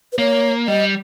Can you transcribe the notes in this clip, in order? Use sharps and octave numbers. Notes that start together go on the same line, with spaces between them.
B4
A#3 C#5
G3 D#5